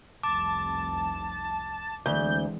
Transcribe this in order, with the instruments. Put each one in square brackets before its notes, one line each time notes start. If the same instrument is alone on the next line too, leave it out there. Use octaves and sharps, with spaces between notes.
[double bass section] F1 C2 [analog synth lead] A5 [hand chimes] D6
[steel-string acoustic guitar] D2 [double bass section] E3 G#3 C4 [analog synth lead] G6